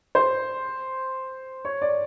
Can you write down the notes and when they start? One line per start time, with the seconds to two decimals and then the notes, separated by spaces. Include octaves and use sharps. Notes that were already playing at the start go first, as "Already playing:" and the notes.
0.15 C5
1.65 C#5
1.82 D5